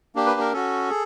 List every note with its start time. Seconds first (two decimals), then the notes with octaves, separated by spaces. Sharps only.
0.15 A#3 D4 G4
0.26 B4
0.40 A#4
0.53 C#4 F#4 A4
0.90 G#4